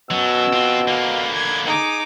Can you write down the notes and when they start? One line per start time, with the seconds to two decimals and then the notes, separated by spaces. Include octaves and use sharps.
0.11 B2 F#3 C#4 E6
0.53 C4 F4
0.88 D3 A#3 F5 B5
1.35 G#6
1.66 D#4 G#4 D6